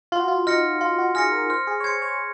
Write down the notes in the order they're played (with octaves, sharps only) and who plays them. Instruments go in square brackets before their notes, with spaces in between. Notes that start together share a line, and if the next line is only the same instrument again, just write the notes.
[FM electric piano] F4 [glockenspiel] C6
[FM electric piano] F#4
F4
[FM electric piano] D#4 [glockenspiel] F6 A#6 C#7
[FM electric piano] F4 [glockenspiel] C6
[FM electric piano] F#4
[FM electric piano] G#4 [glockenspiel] F6 A#6 C#7
[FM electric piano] A#4
[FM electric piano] C5 [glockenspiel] F6
[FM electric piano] G#4
C#5
[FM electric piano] C5 [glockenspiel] G#6 C#7
[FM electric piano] C#5